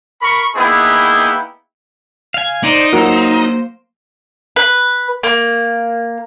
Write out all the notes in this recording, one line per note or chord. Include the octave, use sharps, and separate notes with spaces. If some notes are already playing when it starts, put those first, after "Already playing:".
A#4 B5 C#6
A#3 B3 D#4 E4 G#4 G5
F5 G#5
D#4 C5 D5
F#3 A#3 A#4 C5
B4
A#3